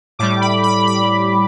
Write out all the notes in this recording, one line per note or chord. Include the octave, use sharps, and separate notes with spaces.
A2 G3 D6
B5
B5
B5